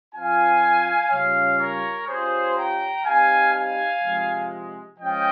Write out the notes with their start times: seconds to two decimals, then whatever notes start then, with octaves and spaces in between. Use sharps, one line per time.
0.14 F3 C4 F4 F5 G#5
1.10 C#3 G3 C#4 F4 C#5 F5
1.59 A#4 C#5
2.07 G3 C#4 F4 G#4 C5
2.56 G5 A#5
3.04 G3 C4 D#4 F5 G#5
3.54 F5 G#5
4.02 C3 F3 G#3
4.99 F3 G#3 C#4 F4 D#5 G5